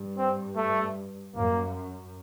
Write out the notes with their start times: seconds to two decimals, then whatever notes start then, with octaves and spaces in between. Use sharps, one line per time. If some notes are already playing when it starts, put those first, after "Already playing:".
Already playing: G2
0.18 C4
0.56 A3
1.35 F#2 A#3